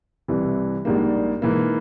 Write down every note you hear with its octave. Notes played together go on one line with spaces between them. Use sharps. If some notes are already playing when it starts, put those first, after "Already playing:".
C2 C3 E3
A#1 G#2 G3 A#3
G#2 E3 A#3